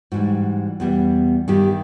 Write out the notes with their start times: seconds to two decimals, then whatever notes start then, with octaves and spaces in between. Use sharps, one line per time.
0.12 G#2 E3 G3 F#4
0.80 E2 B2 G3 B3
1.48 G2 D#3 G3 G4